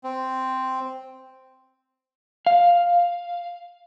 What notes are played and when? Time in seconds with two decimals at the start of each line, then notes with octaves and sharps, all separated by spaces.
0.04 C4
2.47 F5